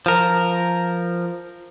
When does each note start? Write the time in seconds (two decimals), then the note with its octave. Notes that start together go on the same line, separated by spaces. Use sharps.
0.06 F3 A#4